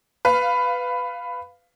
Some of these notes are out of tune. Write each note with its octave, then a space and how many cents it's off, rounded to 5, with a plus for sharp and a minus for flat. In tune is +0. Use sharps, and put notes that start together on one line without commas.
B4 +10 F5 +0